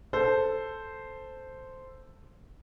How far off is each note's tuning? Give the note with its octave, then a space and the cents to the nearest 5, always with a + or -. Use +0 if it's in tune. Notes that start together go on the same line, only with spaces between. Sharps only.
A4 +0 C5 -5